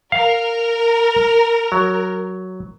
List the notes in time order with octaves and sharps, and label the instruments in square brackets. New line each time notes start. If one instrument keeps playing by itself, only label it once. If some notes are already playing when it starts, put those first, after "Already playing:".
[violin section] A#4 [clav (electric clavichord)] F5
[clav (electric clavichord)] F#3